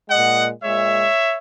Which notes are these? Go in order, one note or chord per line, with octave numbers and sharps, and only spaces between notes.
A#2 G#3 D#5 F#5
A#2 G#3 C#5 E5